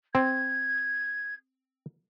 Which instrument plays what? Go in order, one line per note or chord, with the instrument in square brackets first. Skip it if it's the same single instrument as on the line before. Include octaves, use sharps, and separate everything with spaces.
[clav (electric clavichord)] C4 [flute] G#6